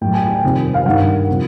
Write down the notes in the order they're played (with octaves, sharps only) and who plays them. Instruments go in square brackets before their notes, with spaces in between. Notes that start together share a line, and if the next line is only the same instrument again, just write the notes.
[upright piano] A2 F#3 G5
G#5
G5
F2 C3 D#3 G3
F5
G2 D#3 G3 F#5
C3 F3